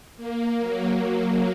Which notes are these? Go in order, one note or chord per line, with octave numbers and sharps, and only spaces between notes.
A#3
F#3